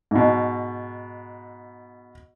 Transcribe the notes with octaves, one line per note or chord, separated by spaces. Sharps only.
G#2 B2